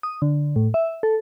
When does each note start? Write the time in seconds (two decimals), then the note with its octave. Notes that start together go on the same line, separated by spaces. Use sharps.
0.03 D#6
0.22 D3
0.56 A2
0.74 E5
1.03 A4